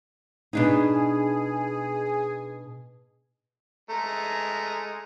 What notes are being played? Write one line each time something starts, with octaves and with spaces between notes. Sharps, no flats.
B2 D4 D#4 G#4
G#3 A3 A#5